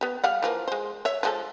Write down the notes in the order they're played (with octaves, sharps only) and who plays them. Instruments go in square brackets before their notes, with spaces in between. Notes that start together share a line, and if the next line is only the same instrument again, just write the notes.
[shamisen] B3 G4
G3 F5 F#5
E3 F3 A#3
G#3 C5
C#5 E5
F3 G#3 A4